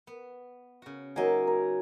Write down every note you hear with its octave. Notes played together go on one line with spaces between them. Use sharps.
B3
C#3 F#4
F#3 A#3 D#4 D#5 E5 G#5
A#4